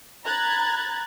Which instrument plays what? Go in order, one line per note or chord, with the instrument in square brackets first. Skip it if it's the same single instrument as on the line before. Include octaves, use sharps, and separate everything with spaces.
[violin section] A#5 B5 F#6 G#6 A6